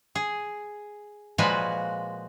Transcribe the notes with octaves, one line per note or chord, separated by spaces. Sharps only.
G#4
A#2 F3 G#3 F#4 B4 G#5